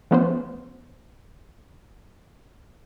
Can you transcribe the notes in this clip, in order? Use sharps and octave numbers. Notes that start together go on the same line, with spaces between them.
F3 A3 B3 C#4 B4 C5